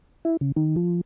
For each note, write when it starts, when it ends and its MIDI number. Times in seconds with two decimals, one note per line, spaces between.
0.25 0.37 64
0.41 0.52 49
0.56 0.76 51
0.76 1.01 53